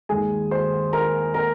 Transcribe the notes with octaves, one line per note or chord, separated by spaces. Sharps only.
D#2 D#3 G#3 G#4 G#5
C5 C6
A#4 A#5
A#4 A#5